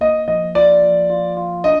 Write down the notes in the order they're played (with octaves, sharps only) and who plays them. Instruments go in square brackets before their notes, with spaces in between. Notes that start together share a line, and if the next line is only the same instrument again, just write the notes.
[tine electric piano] A#3 [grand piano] D#5
[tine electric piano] F3 [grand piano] D#5
[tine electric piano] F4 [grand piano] D5
[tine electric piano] F3
F4
F4
[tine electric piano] D4 [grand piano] D#5